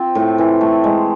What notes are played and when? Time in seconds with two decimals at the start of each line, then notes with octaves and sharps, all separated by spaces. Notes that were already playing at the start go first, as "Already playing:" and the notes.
Already playing: C4 F4
0.15 A2
0.38 E3
0.61 A3
0.84 G#3